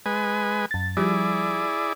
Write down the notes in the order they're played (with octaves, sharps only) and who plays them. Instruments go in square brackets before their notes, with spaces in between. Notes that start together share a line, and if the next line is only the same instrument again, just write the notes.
[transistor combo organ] G#3 B4 G#5
[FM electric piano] F#2 A6
[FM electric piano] F3 G3 [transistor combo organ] E4 G#4 D5